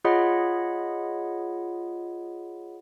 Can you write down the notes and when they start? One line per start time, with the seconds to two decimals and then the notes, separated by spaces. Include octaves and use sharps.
0.05 F4 G#4 C#5 D#5 F#5 B5